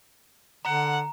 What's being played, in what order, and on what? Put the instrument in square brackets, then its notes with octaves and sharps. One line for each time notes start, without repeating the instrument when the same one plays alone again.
[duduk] D3 [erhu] F#5 [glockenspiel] A#5